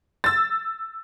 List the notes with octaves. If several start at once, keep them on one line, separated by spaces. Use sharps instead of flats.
E6 A6